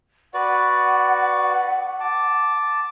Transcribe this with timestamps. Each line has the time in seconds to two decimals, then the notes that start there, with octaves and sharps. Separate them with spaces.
0.34 F#4 B4 D5 F#5
2.00 A5 D6